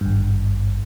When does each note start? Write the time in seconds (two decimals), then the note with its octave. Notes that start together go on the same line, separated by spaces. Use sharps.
0.01 G#1 G2